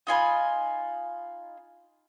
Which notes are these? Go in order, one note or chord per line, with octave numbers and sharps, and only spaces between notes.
D#4 F4 G#5 B5